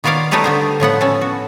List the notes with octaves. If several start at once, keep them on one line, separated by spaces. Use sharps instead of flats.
D#3 B3 F4 C#5 D5 F5
G3 A3 D#4 A4 B4 C#5
D3 B3 C5
A2 F3 B3 F#5
C#4 A4
F#4